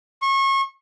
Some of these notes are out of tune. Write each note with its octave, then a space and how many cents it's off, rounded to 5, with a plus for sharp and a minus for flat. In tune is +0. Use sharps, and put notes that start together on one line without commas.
C#6 -30